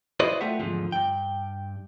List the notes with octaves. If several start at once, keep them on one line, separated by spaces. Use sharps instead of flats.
E4 F#4 B4 C5 D5 D#5
A3 F4 G4 E5 F#5
E2 G#2 D3 F3 F4
G2 G5